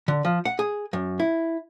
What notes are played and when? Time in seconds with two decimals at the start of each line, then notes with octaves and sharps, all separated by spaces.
0.08 D3
0.25 F3
0.45 F#5
0.59 G#4
0.93 F#2
1.20 E4